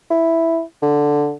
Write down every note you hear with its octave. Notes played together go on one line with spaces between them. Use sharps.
E4
D3